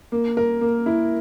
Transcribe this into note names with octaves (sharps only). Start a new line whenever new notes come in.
A#3
A#4
A#3
E4